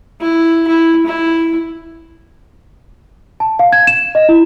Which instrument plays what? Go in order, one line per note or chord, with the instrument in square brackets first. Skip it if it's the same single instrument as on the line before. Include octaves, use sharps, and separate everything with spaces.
[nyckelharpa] E4
E4
E4
[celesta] A5
F5
G#6
E7
D#5
E4